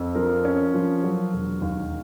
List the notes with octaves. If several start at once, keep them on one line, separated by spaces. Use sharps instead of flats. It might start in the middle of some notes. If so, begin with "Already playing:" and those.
Already playing: F2
F3 A#4
C#4
F3
F#3
E1
D#2